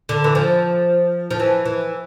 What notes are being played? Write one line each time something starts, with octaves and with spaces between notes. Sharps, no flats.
D3
E3
F3
F3
E3
E3